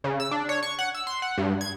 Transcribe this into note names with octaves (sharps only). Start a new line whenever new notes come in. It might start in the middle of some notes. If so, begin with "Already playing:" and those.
C#3
E6
D4
C#5
C#6
F#5
E6
C6
F#5
G2
G#6